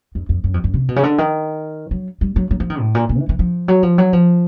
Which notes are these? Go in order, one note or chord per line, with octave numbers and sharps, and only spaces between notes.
F2
F2
F#2
F2
F#2
C3
B2
C#3
D3
D#3
F#3
G3
F#3
F#3
F3
D#3
A2
A#2
A#2
E3
E3
F3
F#3
F3
F#3
F3